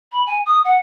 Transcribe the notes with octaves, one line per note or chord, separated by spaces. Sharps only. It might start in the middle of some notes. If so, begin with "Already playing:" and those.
B5
G#5
D#6
F#5